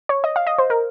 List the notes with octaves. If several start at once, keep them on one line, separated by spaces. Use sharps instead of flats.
C#5
D#5
F5
D#5
C5
A#4